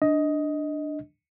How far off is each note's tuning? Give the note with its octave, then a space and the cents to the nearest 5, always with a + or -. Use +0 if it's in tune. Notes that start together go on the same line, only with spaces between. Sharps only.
D4 +10 D#5 +10